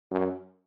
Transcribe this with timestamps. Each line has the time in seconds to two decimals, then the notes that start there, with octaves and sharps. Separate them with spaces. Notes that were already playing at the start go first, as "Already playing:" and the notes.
0.11 F#2